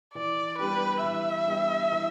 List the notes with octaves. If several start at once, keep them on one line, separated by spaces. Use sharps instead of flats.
E3 D5
G3 B3 D4 G4 B4
E3 E5
G3 B3 D4 G4
E3